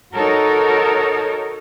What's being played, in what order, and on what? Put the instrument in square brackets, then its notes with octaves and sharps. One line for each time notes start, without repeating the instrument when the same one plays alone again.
[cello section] D#4 F#4 A4 A#4 C#5